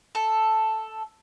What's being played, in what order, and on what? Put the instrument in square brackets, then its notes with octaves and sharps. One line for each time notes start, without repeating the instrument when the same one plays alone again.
[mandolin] A4